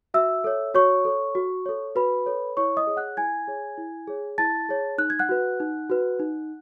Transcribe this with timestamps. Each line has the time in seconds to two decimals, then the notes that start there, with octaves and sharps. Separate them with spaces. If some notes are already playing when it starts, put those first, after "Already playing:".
0.14 F#4 E5 E6
0.44 A4 C#5
0.74 F#4 C#5 C#6
1.05 A4 C#5
1.35 F#4
1.66 A4 C#5
1.95 F#4 B4 B5
2.26 A4 C#5
2.57 E4 C#5 C#6
2.77 D#5 D#6
2.87 G#4 C#5
2.97 F#5 F#6
3.17 E4 G#5 G#6
3.47 G#4 C#5
3.77 E4
4.08 G#4 C#5
4.38 E4 A5 A6
4.69 G#4 C#5
4.98 D#4 F#6
5.10 G#6
5.19 F#5 F#6
5.29 F#4 B4
5.60 D#4
5.90 F#4 B4
6.19 D#4